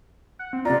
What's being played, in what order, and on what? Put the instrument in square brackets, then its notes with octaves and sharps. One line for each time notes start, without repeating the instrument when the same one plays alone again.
[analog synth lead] F#5
C4
[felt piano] C3 A#5 [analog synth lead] F4 [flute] D5